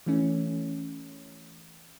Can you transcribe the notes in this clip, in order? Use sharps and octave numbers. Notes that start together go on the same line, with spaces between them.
E3 A3 C#4